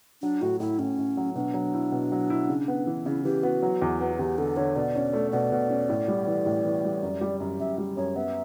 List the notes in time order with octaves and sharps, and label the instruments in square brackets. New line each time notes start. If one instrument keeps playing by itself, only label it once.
[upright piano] F#3 [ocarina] D4
[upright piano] A2 [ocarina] F#4
[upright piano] A2 [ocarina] E4
[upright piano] A2 [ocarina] C#4
[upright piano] A2
F#3
[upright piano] B2 [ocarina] D4
[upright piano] F#3
E4
B2
F#3
E4
C#3
B3
E3
[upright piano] C#3 [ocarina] E4
[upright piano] E3 [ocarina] G4
[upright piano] B3 [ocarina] F#4
[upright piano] F#3
E2
B3
[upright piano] E2 [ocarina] G4
[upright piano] D3 [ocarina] A4
[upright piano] D3 [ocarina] C#5
[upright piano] B2 [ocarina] D5
[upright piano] C#4
A3
[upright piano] B2 [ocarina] D5
[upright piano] B2
C#4
A2
G3
E3
A2
E3
G3
F#2
G3
F#2
[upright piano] F#2 [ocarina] E5
[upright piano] G3
[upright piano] F#2 [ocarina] C#5
[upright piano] B3 [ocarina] E5